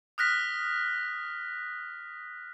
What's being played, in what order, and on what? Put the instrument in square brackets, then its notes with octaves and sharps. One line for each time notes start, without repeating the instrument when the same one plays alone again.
[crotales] D#6 F6 F#6 A#6 B6